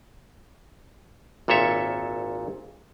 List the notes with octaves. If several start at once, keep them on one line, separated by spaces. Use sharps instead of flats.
G#1 A#2 A4 C#5 E5